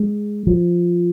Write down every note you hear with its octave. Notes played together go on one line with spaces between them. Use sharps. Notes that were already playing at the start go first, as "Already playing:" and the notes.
Already playing: G#3
F3